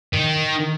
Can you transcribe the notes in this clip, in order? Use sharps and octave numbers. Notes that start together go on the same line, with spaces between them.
D#3